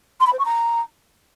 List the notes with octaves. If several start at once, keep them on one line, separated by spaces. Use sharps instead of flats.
C6
B5
C5
C#6
A#5